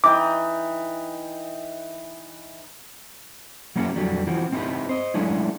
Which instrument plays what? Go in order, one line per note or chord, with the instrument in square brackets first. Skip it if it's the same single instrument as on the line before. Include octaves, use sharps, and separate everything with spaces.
[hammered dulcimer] E3 D#4 G5 [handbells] D6
[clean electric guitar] F#3 A#3 B3 C#4 E4 G#4
F2 D3 F#3 G3
E3 F3 C4 F#4
C4 D#4 E4 F#4 G4 B4
C5 D#5
F#3 G#3 A3 C#4 D4 E4